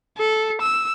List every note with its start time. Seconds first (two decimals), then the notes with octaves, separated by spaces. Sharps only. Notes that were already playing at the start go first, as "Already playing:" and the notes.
0.17 A4
0.61 E6